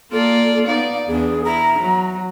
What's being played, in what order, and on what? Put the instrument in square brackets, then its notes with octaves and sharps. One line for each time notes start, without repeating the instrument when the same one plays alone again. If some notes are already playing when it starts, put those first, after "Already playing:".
[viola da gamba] A#3 F4 D5 [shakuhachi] A4
[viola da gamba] B3 D#4 D5 [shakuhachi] F5
[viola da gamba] E2 D4 [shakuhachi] G#4
[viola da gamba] E4 [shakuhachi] A#5
[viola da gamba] F#3